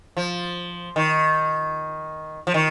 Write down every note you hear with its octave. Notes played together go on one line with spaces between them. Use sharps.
F3
D#3
F3
D#3